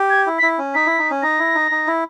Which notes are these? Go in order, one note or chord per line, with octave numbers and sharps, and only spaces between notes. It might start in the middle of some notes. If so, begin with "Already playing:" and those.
Already playing: G4
G#6
E4
B6
E4
C#4
D#4 B6
E4
D#4
C#4
D#4 A#6
E4
D#4
D#4
E4